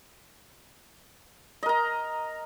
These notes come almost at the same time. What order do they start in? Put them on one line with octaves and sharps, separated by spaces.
D#5 A#4 A#5